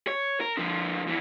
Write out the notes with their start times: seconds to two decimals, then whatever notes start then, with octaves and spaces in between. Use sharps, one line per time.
0.07 C#5
0.41 A#4
0.57 D3 F3
1.07 F2 E3